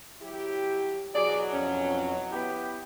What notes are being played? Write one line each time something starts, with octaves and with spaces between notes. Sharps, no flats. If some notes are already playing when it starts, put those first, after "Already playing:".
F#3 E4 G4
B2 E3 F#3 G#4 D5
F2 C#4
B3 E4 G4